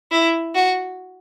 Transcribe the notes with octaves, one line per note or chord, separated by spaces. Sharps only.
E4
F#4